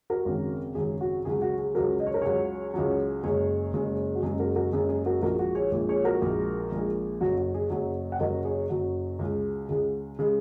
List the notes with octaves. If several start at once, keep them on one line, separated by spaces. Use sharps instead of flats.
F#4 A#4
G#1 F#2 C#3
G#1 F#2 C#3 G#4
F#4
C#2 C#3 F#3 G#4
F#4
G#4
C#2 C#3 F#3 F#4 A#4
D#5
C#5
A#4
C#2 C#3 F#3 G#4 C#5
C#2 C#3 F#3
F#1 F#2 C#3 G#3 G#4 C#5
F#1 F#2 C#3 G#3
F#4
F#1 F#2 C#3 G#3 G#4
F#4 A#4
F#4 A#4
F#1 F#2 C#3 G#3 G#4
G#4
F#4 A#4
A#1 A#2 G#3 F#4 A#4
F#4
G#4 C#5
A#1 A#2 G#3
G#4 C#5
F#4 A#4
A#1 A#2 G#3
A#1 A#2 G#3
F#1 F#2 F#3 F#4
F#4
G#4
F#1 F#2 F#3 G#4
F#5
F#1 F#2 F#3 A#4 D#5
G#4 C#5
F#1 F#2 F#3 F#4
C#2 C#3 G#3
C#2 C#3 G#3
C#3 G#3